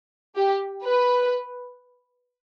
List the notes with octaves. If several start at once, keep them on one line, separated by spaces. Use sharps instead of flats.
G4
B4